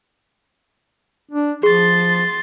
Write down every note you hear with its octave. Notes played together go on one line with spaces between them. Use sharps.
D4
F3 G#4 C6 A6